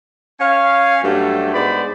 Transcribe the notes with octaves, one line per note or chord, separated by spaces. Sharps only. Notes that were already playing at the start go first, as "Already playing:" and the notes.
C#4 C#5 F5
G2 F#3 G3 A3 A4
G#2 B3 C5 D5 B5